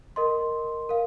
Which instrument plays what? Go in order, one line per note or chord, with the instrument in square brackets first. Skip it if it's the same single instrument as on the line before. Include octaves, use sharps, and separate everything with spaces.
[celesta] A#4 D#5 C6
A#4 F5